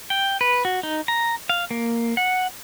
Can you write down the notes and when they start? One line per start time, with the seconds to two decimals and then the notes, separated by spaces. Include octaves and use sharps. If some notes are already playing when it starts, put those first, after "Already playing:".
0.10 G5
0.41 B4
0.65 F#4
0.83 D#4
1.08 A#5
1.50 F5
1.71 A#3
2.17 F#5